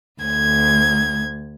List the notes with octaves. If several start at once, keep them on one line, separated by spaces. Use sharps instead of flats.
D2 G#6